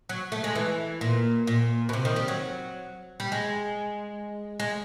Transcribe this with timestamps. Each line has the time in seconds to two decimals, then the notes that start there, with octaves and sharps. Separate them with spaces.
0.09 F#3
0.32 A3
0.44 G#3
0.55 E3
1.01 A#2
1.47 A#2
1.89 B2
1.93 C3
2.05 D#3
2.16 G3
2.28 F#3
3.20 G3
3.32 G#3
4.60 G#3